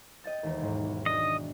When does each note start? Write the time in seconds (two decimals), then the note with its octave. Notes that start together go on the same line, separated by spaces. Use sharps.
0.24 D#5 G5 A6
0.43 E1 D#2
0.60 B1 G#2
1.06 D4 D#5